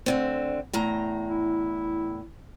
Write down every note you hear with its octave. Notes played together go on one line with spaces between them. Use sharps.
D2 D3 C4
E2 A2 A#5
E4